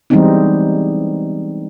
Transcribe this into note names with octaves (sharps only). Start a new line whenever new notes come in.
E3 G3 G#3 B3 C4 D#4